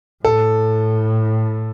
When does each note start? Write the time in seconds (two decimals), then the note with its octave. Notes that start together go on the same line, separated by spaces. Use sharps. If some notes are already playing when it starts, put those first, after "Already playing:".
0.24 A2 A4